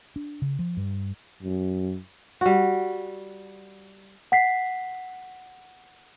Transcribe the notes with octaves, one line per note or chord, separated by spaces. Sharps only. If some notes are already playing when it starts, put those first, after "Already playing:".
D4
C#3
F3
G2
F#2
G3 F#4
F#5 B6 C7